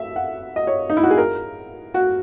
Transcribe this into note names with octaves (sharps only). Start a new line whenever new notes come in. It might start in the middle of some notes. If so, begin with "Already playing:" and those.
Already playing: E5
F#5
D#5
C#5
D#4
E4
F#4
G#4
A#4
F#4